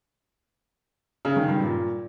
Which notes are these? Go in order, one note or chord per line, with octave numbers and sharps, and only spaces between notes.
C#3
D#3
G2
A#2